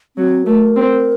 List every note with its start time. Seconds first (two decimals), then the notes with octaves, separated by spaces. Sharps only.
0.17 F#3 C4
0.46 A3 A#4
0.76 C4